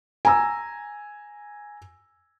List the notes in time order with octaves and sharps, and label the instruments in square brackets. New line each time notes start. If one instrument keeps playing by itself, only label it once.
[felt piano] G#5 A#5 E6